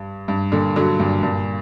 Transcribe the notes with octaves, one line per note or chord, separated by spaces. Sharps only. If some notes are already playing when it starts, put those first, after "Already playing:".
Already playing: G2
G2
A#2 D3
D3 F#3
G2 A#2
G2 A#2